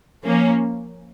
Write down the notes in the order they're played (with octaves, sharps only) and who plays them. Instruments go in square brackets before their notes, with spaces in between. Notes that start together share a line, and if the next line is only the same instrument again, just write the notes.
[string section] F3 A#3 C#4